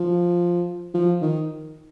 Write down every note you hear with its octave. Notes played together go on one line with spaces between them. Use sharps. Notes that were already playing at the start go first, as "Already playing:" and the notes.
Already playing: F3
F3
D#3